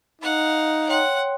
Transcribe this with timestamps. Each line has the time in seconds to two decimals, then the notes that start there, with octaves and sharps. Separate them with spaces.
0.21 D#4 F5 F#5
0.88 C#5 F#5 G5 C6